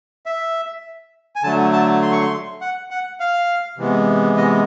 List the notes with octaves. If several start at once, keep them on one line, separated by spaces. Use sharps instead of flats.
E5
G#5
D3 F#3 A3 A5
A5
C6
C#6
C6
F#5
F#5
F5
C3 E3 G#3 B3
D#5